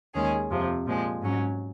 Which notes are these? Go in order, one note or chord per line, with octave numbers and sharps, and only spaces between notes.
D#2 D#3 G#3 C#4 G#4
F2 C3 F3
A#2 F3 G#3
G#2 F#3 C#4